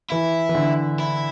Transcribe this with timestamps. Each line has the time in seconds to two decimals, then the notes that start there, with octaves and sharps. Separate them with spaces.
0.10 E3 E4
0.49 E3
0.55 D3
1.00 E4